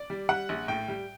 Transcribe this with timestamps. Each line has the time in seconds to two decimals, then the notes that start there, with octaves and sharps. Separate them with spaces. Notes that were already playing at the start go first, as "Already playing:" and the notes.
Already playing: D5
0.10 G3
0.29 G3 F#5
0.49 A#1
0.68 A2 G5
0.88 G3